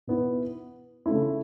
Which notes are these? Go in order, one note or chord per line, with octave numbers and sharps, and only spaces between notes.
B2 B3 E4
C#3 A3 E4